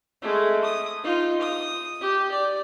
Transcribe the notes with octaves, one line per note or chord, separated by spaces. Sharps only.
G#3 A3
D#6
D#4 F4
D#6
G4
D5